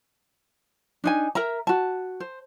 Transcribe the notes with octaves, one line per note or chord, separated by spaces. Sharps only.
D4 D#4 G#5
A#4 E5 A#5
F#4 A5
C5